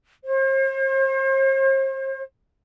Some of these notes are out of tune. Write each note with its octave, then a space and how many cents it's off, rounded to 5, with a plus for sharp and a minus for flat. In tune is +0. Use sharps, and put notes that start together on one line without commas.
C5 +45